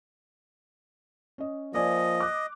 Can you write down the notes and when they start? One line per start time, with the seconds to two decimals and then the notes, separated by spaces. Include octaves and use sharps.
1.38 C#4 D#5
1.74 F3 A#3 D5 D#5 G#5
2.20 D6 F#6